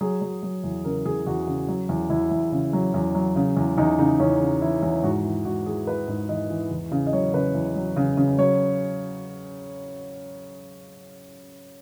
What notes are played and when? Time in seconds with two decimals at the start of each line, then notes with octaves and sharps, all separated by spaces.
0.01 F#3 G#4
0.22 F#3
0.43 F#3
0.64 E2
0.84 C#3 A#4
1.06 E2 G#4
1.26 E2 F#4
1.47 C#3
1.69 F#3
1.89 E2
2.10 E2 E4
2.31 E2
2.52 C#3
2.73 F#3
2.94 E2
3.15 F#3
3.36 C#3
3.57 E2
3.78 E2 D#4
3.99 C#3 D#4
4.20 E2 C#4
4.41 C#3
4.61 E3 E4
4.82 E2
5.03 G#2 F#4
5.24 E3
5.45 G#2 F#4
5.66 E3 G#4
5.87 E3 B4
6.08 G#2
6.29 E3 D#5
6.50 E3
6.71 E2
6.92 C#3
7.07 D#5
7.13 F#3 C#5
7.34 C#3 B4
7.54 E2
7.76 F#3
7.96 C#3
8.17 C#3
8.38 F#3 C#5